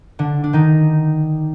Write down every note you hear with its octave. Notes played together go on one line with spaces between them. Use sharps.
D3 D4
D4
D#3 D#4